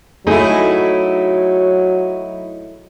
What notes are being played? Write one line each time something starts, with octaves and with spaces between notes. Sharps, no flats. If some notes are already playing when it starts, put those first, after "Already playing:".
F#3 A3 D#4 E4 F#4 G#4